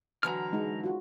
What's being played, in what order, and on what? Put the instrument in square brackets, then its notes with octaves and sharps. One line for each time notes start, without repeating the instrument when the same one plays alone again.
[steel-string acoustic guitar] D3 E3 F#3 [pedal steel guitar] A#5 F6
[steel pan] G#3 D#4
F4 F#4